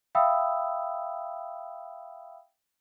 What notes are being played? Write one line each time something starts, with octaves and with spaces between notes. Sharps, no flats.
E5 F5 G5 B5 D#6 E6